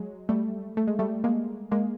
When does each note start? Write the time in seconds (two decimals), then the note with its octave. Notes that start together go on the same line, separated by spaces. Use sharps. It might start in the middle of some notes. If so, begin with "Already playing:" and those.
Already playing: F#3 G#3
0.29 G3 A3
0.77 A3
0.87 G#3
0.99 G3 A3
1.24 G#3 A#3
1.72 G#3 A#3